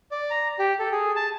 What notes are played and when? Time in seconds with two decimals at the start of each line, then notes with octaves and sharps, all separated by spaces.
0.11 D5
0.30 A#5
0.59 G4
0.80 A4
0.92 G#4
1.16 A5